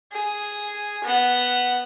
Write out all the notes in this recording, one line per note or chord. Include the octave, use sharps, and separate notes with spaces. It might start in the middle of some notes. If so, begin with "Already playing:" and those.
G#4
B3 F#5